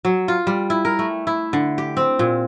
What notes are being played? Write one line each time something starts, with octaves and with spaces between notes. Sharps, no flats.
F#3
F4
G3
E4
A#4
A3
E4
D3
G4
C4
A#2